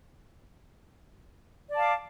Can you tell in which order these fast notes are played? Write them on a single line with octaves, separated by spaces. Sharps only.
D5 A5 F5 D6